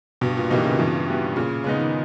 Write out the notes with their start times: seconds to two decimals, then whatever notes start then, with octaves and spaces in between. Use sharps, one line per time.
0.21 G2 B2
0.37 A#2
0.50 B2 E3 G3 A#3 D#4
0.64 C#3
0.79 G2 E3
1.08 G3 B3
1.36 A#2 C#3
1.64 C#3 G#3 B3 D#4
1.79 D#3